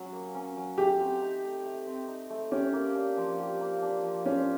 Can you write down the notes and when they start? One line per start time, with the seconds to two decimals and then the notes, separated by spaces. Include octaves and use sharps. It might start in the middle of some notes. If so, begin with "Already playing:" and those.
Already playing: F#3 C#4
0.13 A#3
0.35 C#4
0.57 F#3
0.78 A3 G4
0.99 C4
1.22 D#4
1.44 A3
1.66 A3
1.87 C4
2.08 D#4
2.30 A3
2.51 C#4 G4
2.73 A#3
2.95 D4
3.17 F3
3.39 G4
3.61 A#3
3.82 D4
4.03 F3
4.26 C#4 C5